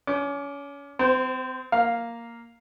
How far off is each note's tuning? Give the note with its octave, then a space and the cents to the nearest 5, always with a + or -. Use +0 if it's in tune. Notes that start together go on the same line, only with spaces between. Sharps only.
C#4 +30 D6 -5
C4 -35 C5 +0
A#3 +0 F5 +0